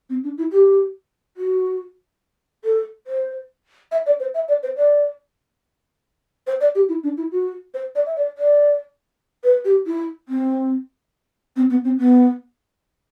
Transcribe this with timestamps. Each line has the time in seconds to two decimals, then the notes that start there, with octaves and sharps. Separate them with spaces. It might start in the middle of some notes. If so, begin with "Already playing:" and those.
0.10 C4
0.24 D4
0.38 E4
0.52 G4
1.37 F#4
2.64 A4
3.07 C5
3.92 E5
4.06 D5
4.20 C5
4.34 E5
4.48 D5
4.63 C5
4.77 D5
6.47 C5
6.60 D5
6.75 G4
6.89 E4
7.04 D4
7.17 E4
7.32 F#4
7.74 C5
7.95 D5
8.06 E5
8.16 D5
8.38 D5
9.44 B4
9.65 G4
9.86 E4
10.29 C4
11.56 C4
11.70 B3
11.84 C4
11.99 B3